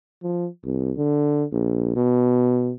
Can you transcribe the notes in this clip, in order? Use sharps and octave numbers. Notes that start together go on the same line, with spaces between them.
F3
C2
D3
A#1
B2